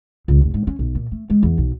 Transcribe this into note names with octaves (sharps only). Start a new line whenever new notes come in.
C#2
F1
G#2
C#4
B1
A#2
A3
G#3
E2
B1